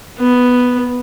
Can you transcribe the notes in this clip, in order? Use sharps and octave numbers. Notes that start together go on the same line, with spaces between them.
B3